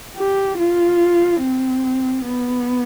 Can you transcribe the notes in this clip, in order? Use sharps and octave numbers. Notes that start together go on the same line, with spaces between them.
G4
F4
C4
B3